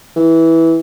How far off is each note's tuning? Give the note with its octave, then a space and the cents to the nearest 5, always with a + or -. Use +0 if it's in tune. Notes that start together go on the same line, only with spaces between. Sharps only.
E3 -10